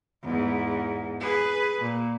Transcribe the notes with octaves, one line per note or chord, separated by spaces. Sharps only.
E2 G#2
G#4 B4
A#2